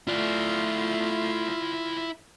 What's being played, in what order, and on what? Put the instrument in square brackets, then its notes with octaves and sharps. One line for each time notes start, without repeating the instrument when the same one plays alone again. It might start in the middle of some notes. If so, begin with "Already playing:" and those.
[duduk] A3 [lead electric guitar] E4 D5 [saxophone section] F4